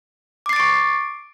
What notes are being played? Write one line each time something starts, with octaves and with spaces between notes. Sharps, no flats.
C#6 D6 A6 C7 D7